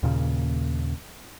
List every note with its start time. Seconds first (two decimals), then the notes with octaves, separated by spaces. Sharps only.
0.03 D#2 A#2 C#3